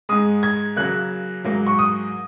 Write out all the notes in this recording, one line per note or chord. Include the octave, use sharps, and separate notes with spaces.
G#2 G#3 D#6
G#6
C#3 F#3 A#3 F#6
G#2 F#3 A#3
C#6
D#6